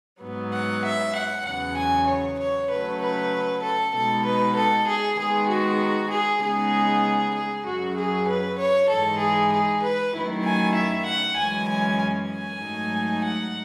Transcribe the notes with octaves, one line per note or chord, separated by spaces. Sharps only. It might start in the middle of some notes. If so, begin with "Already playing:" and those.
G#2 F#3 B3
F#5
E5
F#5
E2 C#3 F#3 B3 F#5
G#5
C#5
C#5
C#3 F#3 A3 B4
B4
A4
B2 G#3 B3 D#4 A4
B4
A4
G#4
D#3 G#3 B3 G#4
F#4
G#4
C#3 G#3 B3 D#4 G#4
G#4
F#2 C#3 F#3 F#4
G#4
B4
C#5
G#2 E3 G#3 D#4 A4
G#4
G#4
B4
F#2 D#3 F#3 A3 E4
G#5
E5
F#5
F#2 E3 G#3 C#4 G#5
G#5
G#5
G#2 F#3 A3 D#4
F#5